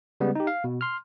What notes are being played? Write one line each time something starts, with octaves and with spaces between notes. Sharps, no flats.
C#3 G3 G#3 B3
D#4 G4
F5
B2
C6 F6